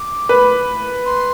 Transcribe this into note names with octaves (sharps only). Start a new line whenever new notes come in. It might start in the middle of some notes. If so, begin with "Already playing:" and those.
Already playing: D6
B4
C6